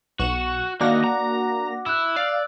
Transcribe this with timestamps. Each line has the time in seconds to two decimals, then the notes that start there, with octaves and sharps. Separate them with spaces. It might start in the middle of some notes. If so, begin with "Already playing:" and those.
0.20 B1 F#4 C#6 E7
0.81 D#3 A#3 D4 F#4 F#5 D6 A#6
1.04 A#5
1.86 E4 E6 F#6
2.16 D5 F5